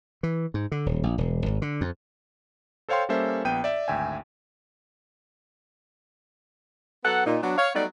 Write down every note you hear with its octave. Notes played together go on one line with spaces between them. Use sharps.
E3
G#2
D3
D#1
A#1
E1
G#1
D3
F2
A4 C5 C#5 F5 G5 C6
G3 A#3 C#4 A4 C5 E5
A#1 B3 G5 G6 D#7
D5 E5
G#1 D2 E5 G5 G#5
F#3 B3 A4 F#5
A#2 D#4
F#3 B3 D4
C#5 F5
F#3 G3 A3 B3 D#4 D5